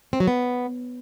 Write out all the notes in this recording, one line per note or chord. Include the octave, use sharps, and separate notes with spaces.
C4
F#3
B3